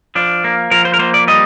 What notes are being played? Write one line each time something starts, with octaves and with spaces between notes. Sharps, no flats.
F3 D4
A#3
F3 A#4
C5
A#4
A#3 C5
D5
G3 D#5